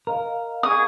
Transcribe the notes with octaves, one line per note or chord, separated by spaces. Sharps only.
A#4 D#5 F5 A#5
G#4 C#6 D#6